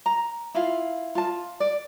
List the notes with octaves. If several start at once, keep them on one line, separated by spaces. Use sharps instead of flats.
A#5
E4 F4 F5
F4 A5
D5